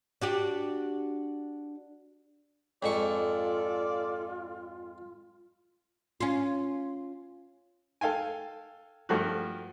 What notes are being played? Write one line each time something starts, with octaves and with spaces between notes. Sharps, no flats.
D4 F#4 G4
F2 G#2 F4 A4 D5 C#6
C#4 F4
A4 F5 G5 G#5
G2 F3 A3 F#4